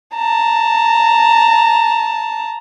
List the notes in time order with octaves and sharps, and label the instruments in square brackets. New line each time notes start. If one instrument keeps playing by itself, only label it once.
[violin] A5 A#5